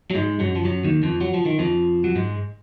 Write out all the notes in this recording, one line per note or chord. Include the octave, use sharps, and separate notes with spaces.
F#3
G#2 G#3
F#2 F#3
F3
F#2 F#3
D#2 D#3
F2 F3
F#3
F3
D#3
F2 F3
F#3
G#2 G#3